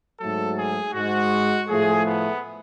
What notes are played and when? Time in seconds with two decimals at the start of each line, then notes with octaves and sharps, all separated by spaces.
0.20 G#2 F#3 A3 A4
0.57 G#4
0.94 G#2 G#3 F#4
1.68 A2 F3 A3 G#4
2.06 B3